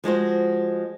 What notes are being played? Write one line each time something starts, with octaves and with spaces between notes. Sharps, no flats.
F3 G#3 F#4 C5